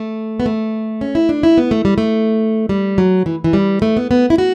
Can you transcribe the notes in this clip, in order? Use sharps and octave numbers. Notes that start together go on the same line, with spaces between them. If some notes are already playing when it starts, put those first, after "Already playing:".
Already playing: A3
B3
A3
C#4
E4
D4
E4
B3
A3
G3
A3
G3
F#3
E3
E3
G3
A3
B3
B3
E4
F#4